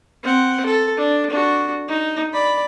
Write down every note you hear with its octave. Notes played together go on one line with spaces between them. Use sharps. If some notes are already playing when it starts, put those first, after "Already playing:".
C4 F#5
A4
D4
D4 F#4
D#4
D5 B5